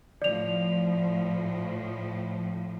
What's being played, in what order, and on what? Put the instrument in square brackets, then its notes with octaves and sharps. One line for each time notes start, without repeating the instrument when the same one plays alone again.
[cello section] A2 F3 [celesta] D5 F7